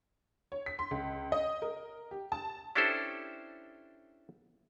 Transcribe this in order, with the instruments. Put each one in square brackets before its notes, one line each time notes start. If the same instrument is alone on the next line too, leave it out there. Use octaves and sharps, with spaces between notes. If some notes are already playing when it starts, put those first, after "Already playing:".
[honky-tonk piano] C#5
B6
C6
C#2
D#5
A#4
G4
A5
[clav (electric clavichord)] C#4 D4 E4 G4 A4 C5